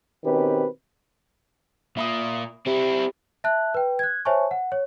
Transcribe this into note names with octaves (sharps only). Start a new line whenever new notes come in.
B2 D#3 C4 C#4 G4 B4
A#2 A#3 E5 B5 D#6
C4 E4 G4
E5 A5 F#6
B4 G5
F#6 G#6
C5 C#5 E5 G#5 A5 C#6
F#5
C#5